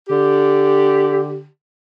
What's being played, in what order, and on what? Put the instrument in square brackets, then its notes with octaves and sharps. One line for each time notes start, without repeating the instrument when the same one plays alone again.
[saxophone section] D3 G4